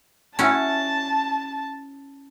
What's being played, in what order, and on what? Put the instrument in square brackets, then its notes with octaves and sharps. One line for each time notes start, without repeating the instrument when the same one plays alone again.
[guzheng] C#4 E4 F#4 [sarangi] A5